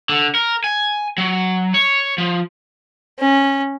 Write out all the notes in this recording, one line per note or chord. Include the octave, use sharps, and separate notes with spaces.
D3
A#4
G#5
F#3
C#5
F3
C#4